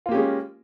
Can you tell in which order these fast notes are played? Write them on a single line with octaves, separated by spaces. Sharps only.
F4 A#3 G4 C#4 G#3